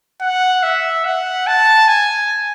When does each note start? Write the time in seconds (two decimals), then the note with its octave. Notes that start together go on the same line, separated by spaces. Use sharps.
0.21 F#5
0.63 E5
1.05 F#5
1.47 A5
1.88 G#5